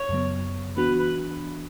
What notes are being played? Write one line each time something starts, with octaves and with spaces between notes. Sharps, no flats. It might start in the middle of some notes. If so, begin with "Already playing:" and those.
Already playing: C#5
F#2 C#3 F#3 B3
E3 B3 D4 F#4 B4
B4